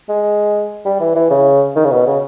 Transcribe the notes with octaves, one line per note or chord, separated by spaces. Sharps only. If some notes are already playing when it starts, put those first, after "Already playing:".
G#3
G3
E3
E3
C#3
D#3
C#3
B2
C#3